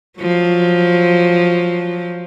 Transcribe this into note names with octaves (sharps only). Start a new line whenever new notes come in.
F3 F#3